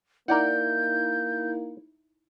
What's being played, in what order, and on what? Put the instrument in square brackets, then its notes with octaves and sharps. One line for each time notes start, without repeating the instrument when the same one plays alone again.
[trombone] A#3 [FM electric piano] D#4 E4 [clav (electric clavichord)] A#4 D5 F#5 [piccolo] G6